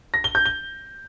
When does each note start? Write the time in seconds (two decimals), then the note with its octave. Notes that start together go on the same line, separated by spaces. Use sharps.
0.14 A#6
0.24 G7
0.35 G6
0.46 G7